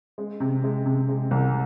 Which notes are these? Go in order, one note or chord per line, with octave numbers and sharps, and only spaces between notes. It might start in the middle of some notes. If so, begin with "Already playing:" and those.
G#3
C3
G#3
C3
G#3
C2